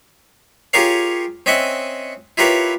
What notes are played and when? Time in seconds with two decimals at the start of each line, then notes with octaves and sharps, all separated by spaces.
0.73 F4 G4 G#4 A#4 C#5 F5
1.46 C4 C#4 D#5 E5 F#5
2.37 E4 F4 G4 A#4 B4 C#5